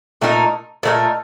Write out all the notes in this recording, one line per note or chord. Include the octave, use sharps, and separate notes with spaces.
A#2 A3 D#4 A#4
A#2 A3 D#4 A#4